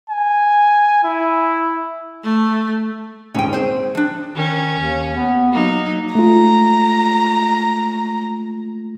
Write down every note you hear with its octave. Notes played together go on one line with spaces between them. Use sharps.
G#5
E4
A3
D#1 G#2 C#4 G5 D#7
C4 G#4 C5
F3 D4
D#3 C#4
D#2
B3
F#3 A#3 D#4
A3 F4 A#5